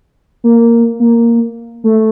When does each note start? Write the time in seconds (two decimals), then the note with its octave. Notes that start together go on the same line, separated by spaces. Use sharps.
0.44 A#3
1.00 A#3
1.84 A3